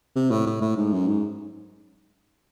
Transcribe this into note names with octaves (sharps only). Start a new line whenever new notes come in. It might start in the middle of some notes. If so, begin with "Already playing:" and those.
C3
A2
A2
A2
G#2
F#2
G#2